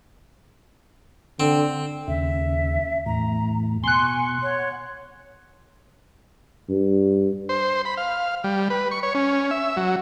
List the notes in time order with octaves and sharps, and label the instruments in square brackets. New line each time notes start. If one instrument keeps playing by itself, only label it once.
[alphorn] D3 [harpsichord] C4
[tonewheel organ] D#2 C#3 [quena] E5
[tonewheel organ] E2 A2 [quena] A#5
[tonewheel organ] B2 C#6 [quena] G#5 [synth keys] C6 F#6
[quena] C#5 [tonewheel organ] F#5
[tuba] G2
[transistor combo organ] C5
B5
F5
G3
B4
C#6
C#5
C#4
E5
F#3